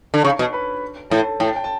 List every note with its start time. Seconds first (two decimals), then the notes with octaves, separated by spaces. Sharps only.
0.14 D3
0.24 C#3 C#5 C#6
0.39 B2
0.53 B4 B5
1.10 A2 A4 A5
1.40 A2 G5
1.47 A5
1.56 G5
1.64 A5